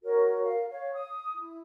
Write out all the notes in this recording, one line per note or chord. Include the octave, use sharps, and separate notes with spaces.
F#4 A#4 C#5
A#4 F5
C#5 F5
D#6
E4